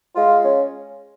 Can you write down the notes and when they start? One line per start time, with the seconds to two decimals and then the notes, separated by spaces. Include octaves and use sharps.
0.16 G#3 F4
0.44 C#4